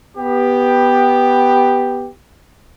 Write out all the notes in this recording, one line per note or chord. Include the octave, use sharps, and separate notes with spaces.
B3 G4